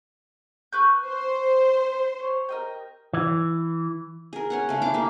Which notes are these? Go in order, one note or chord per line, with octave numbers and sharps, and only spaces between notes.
B4 C#6 G6
C5
C#5
A#4 D#5 G5
E3
G#4 A#4
C#4 C#5 F#5
C#3 A3
D4 E4 F5 D6
G3 A#3